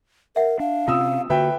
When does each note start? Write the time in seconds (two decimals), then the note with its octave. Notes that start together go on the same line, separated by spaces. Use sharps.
0.36 A#4 E5 F#5
0.60 D4 F5
0.88 C3 C4 C#4 F4 D#6 E6
1.30 D3 A#3 F#4 B4 E5 G5